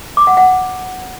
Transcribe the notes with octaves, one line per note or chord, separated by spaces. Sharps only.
D6
F#5
F#5